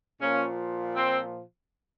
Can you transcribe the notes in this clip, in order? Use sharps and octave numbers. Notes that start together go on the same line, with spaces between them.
A#2 F3 A#3 C#4
C4